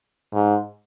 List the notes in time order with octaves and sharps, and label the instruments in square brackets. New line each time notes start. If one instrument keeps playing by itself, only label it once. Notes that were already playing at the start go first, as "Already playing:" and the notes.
[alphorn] G#2